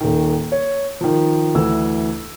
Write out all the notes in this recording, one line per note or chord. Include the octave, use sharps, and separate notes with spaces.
D#1 D#3
C#5
D#3 F3
D2 E3 E6